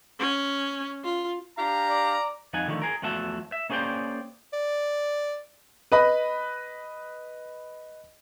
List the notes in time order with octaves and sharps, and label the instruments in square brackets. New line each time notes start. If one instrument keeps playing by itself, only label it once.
[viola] C#4
F4
[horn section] D4 G4 F5 [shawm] A#5
[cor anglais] D5
[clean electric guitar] F2 F3 D#4 F#5 G#5
D3 D#3 F3 F#3 A3
G#4 A#4
E2 F3 A3 F#4 E5 A5
E5
A#3 C#4 G#4 C5 D5 G5
[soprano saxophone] D5
[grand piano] B4 D#5 B5